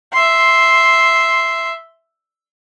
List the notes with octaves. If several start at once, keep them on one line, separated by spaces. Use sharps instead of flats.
E5 C6